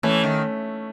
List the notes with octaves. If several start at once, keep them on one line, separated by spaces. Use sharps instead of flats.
E3 A3 C#4
D#3